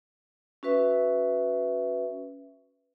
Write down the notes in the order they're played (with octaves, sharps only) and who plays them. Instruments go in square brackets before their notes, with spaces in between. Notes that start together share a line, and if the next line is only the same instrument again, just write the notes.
[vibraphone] C#4 F#4 B4 E5